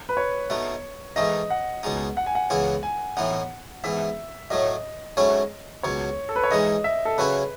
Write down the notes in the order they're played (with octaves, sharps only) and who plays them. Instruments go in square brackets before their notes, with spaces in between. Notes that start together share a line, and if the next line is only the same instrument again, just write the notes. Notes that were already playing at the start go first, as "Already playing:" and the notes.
[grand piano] B4
C#5
[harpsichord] B2 A3 D#4
[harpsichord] G#2 E3 A3 D#4 [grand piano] D#5
[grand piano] F#5
[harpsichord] C#2 B2 G#3 D#4
[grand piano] F#5
G#5
F#5
[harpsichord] C#2 C#3 E3 B3 E4
[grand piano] G#5
[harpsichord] A2 E3 B3 D#4 [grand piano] F#5
[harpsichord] G#2 E3 B3 [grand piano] E5
[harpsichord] A2 F#3 A3 [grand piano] D#5
[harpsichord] G#2 F#3 A3 C#4 E4
[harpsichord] C#2 B2 F#3 [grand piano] C#5
[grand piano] A4
B4
C#5
[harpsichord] G#2 E3 G#3 D#4 [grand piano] D#5
[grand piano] E5
A4
[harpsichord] C#3 F#3 C#4 E4 [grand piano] B4